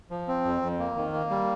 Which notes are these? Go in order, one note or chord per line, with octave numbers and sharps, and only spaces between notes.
F3
C4
F2
F2
A#3
D#3
A#3
G3